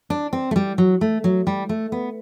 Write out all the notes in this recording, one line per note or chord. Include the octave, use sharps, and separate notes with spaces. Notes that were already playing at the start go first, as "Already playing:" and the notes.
D4
C4
A3
G3
F#3
A3
F#3
G3
A3
B3